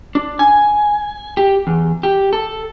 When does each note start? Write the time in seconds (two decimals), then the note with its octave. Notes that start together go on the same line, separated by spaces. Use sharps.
0.15 D4
0.39 G#5
1.37 G4
1.67 E2
2.03 G4
2.33 A4